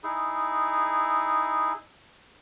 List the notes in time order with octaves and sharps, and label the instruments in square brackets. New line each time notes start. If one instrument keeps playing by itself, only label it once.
[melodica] D#4 E4 G#4